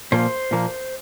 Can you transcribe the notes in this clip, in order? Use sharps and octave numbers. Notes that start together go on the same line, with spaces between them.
A#2 F3 A#3 C5
A#2 F3 A#3